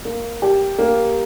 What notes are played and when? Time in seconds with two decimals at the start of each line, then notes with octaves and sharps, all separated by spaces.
0.05 A#3
0.42 G4
0.78 A#3